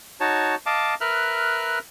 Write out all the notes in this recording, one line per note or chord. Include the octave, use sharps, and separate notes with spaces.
D#4 F#4 C#5 A5
D#5 F5 A5 D6
A#4 B4 E5 F6 F#6